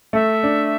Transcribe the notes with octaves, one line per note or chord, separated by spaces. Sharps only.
A3 E5
D4